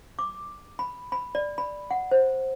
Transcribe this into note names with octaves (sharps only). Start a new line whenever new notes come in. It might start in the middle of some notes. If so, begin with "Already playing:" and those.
D6
B5
B5
D5
B5
F#5
C5